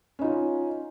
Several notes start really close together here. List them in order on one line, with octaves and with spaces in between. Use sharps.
C#4 D#4 F4